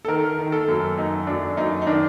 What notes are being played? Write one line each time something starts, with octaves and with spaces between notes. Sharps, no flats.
A4
D#3 A#4
D#3
A4
F#2
F#2 D#4
F#2 D4
F#2 D#4
D#4
D#3 D4